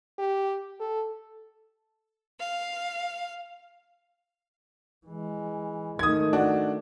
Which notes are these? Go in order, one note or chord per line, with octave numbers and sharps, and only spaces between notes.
G4
A4
F5
E3 G#3
D#3 A3 D#6 G#6
D4 F#4